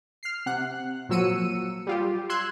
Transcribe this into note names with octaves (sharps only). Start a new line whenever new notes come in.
F6 C7
C3 F#5 F#6
A#2 F3 F#3 E6 C#7 D#7
G3 F4 G4
C6 E6 F#6 G#6